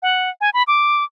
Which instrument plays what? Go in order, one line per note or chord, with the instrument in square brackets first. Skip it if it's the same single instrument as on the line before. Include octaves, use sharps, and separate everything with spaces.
[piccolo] F#5
G#5
B5
D6